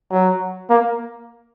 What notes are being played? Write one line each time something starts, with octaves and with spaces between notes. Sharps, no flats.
F#3
A#3